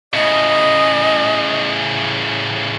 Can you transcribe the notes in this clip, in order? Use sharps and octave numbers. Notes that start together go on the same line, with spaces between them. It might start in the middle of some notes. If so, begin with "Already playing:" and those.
A2 C#3 D#5